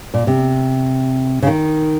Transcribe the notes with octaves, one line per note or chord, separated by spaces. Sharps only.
A#2
C3
C#3
D#3